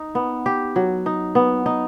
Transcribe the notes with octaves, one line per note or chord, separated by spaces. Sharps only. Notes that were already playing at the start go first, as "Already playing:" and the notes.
Already playing: D#4
B3
G4
F#3
D#4
B3
D#4